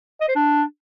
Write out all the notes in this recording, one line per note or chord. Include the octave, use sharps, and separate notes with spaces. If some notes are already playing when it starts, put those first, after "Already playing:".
D#5
C5
D4